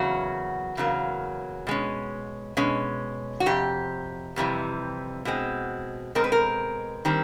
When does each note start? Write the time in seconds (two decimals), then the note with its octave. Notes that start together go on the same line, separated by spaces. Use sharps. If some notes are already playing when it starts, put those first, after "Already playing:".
Already playing: E2 C#3 F#3 A#3 F#4
0.77 E2 C#3 F#3 A#3
1.67 B2 G#3 C#4
2.57 B2 G#3 C#4
3.40 F#4
3.46 F2 C3 G4
4.36 F2 C3 E3 G3
5.25 B2 G#3 C4
6.15 B2 G#3 C4 A#4
6.24 B4
6.32 A#4
7.05 D#3 G3 C4